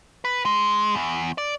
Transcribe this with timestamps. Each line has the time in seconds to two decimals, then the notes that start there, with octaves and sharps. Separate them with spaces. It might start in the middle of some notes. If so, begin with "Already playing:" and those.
0.25 B4
0.45 G#3
0.95 E2
1.38 D5